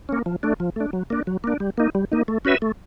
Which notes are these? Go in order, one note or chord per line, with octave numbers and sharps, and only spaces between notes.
A#3 C#4
F3
A3 D4
F3
A3 D4
F#3
A#3 D4
F#3
A#3 D4
G3
A#3 D#4
G3
A#3 D#4
A3
C#4 F#4 B4 E5
A3